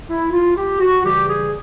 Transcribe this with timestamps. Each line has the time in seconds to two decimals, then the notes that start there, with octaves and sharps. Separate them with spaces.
0.09 E4
0.32 F4
0.57 G4
0.80 F#4
1.03 C#3 E3 G3 G4
1.28 G#4